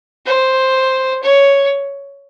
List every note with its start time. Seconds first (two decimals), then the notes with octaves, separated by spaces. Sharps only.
0.26 C5
1.23 C#5